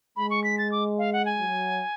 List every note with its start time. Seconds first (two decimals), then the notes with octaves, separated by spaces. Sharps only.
0.17 G#3 B5
0.30 C#6
0.44 B6
0.58 A6
0.72 D6
0.98 F5
1.13 F#5
1.25 G#5
1.39 F#3